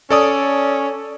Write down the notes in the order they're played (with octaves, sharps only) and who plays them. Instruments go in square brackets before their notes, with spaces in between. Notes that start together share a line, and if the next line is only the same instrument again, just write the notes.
[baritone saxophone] C#4 [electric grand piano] A4 D5 D#6